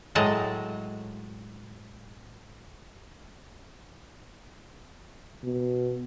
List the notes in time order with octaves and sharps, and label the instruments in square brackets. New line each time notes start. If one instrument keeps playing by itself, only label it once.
[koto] A2 F#3 G#3 D#5 A5
[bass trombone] B2